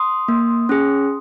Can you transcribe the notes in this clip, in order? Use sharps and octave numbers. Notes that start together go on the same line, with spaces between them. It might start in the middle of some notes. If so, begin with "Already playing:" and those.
Already playing: C6 D#6
A#3
C#4 G#4